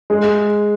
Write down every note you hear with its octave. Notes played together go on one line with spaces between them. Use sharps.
G#3